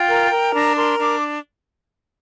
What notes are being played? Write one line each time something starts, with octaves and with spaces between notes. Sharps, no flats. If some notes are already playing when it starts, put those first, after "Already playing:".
Already playing: F4 G5
A#4
A#4
A5
D4 A#5
A#4 C6
D4 D6